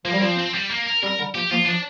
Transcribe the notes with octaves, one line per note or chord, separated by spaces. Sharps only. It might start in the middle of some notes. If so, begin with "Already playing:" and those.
F3 A#3
G3
F3 C4
C4
G3
A#3
A#4
G3 C4 A#4
D3 G3
F3 A#3 G4
F3 A#3 F4
F3 D4